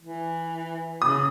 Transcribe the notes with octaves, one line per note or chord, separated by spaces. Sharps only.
E3
C#3 D#6